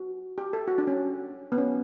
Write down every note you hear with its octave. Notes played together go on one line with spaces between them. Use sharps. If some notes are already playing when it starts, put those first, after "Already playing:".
Already playing: F#4
G4
A4
F#4
D4
C#4
B3
C#4